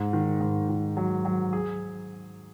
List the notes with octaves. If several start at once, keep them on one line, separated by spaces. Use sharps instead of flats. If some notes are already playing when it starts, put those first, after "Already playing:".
Already playing: G#2
D#3
G#2
D#3
F#3
F#3
G#4